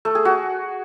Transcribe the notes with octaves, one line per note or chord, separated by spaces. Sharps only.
A3
G#4
F#4